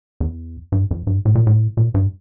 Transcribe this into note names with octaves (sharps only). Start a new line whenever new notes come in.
E2
G2
F2
G2
A2
A#2
A2
A#2
G2